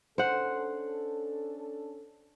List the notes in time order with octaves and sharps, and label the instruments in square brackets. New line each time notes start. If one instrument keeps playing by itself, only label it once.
[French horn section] C#4 D4 A4 [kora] C5 F#5